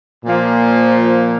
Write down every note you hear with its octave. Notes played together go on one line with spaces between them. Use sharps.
A#2 F3 A#3